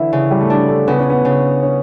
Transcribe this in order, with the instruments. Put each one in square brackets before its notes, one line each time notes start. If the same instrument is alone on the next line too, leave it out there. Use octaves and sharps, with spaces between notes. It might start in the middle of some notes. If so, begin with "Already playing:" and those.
Already playing: [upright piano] D3 E3 [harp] E4
[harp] C#3
[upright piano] G3
A3
[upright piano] G3 [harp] D4
[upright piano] A3
[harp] C#3 [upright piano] B3
[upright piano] C#4
B3
[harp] C#3
[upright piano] C#4